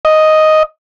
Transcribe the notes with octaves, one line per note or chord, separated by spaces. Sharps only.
D#5